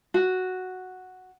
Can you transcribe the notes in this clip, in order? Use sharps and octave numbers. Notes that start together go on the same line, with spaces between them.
F#4